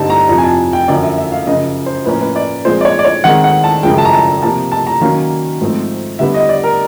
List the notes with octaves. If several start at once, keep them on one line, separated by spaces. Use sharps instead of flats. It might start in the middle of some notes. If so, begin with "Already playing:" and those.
Already playing: G2 D3 G3 C4 D#4 A5
A#5
F2 C3 F3 A#5
G#5
A5
G5
F#2 D3 F3 D5
E5
E5
F5
F#2 C#3 F3 D#5
C5
A2 F3 A#3 C#4 B4
B4
D5
A#2 F3 G#3 C4 C5
D5
C#5
D5
C#5
D#3 G#3 C4 F#5
F#5
A5
F#2 C#3 F3 G#3 G5
A5
A#5
A5
C3 F3 A#3 A5
A5
A#5
D#3 F#3 A#3 C#4 F5
G#2 F3 A3 C4
D3 G3 B3 D4 E5
D#5
D5
A#4